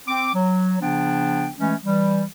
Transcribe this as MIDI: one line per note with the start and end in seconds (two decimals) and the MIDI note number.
0.08 0.30 60
0.08 0.30 86
0.34 0.76 54
0.81 1.48 49
0.81 1.48 53
0.81 1.48 59
0.81 1.48 62
0.81 1.48 79
1.58 1.74 52
1.58 1.74 56
1.58 1.74 57
1.58 1.74 61
1.84 2.23 52
1.84 2.23 55